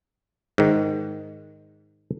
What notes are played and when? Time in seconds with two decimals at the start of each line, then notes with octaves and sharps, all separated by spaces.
0.58 G#2 D#3